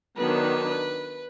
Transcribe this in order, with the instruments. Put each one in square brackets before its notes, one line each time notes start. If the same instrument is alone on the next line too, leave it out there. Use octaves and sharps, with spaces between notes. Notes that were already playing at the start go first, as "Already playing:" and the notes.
[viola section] D#3 F#3 B3 D4 [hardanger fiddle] B4